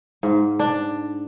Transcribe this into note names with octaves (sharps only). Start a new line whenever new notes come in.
G#2
D4